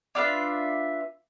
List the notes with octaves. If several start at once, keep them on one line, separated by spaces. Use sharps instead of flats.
D4 F4 B4 E5